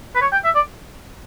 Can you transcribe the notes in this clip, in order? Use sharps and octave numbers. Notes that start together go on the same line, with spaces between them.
B4
C#5
G5
E5
D5